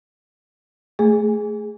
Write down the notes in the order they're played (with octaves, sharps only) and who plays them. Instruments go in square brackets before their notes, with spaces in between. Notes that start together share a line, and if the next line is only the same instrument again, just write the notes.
[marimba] A3 [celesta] G#4